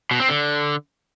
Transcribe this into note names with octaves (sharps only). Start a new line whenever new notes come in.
B2
C4
D3